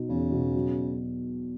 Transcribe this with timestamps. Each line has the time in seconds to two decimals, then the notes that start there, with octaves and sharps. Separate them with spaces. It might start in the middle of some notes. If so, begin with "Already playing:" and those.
Already playing: B2 D#4
0.09 E2 C#3
0.32 B2
0.55 F#3